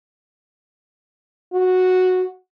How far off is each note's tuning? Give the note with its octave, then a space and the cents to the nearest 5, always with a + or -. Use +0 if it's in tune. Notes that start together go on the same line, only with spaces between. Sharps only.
F#4 -5